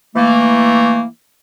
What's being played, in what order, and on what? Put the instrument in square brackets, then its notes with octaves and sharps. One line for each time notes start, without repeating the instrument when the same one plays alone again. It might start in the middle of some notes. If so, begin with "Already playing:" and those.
[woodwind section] E3 A3 A#3